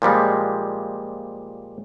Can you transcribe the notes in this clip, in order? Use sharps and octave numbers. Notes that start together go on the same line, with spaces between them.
A#2 F3 G3 G#3